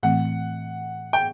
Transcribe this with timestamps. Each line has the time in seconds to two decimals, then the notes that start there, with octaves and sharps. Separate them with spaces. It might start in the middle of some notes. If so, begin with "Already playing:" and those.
0.03 A2 E3 A3 C4 F#5
1.13 G5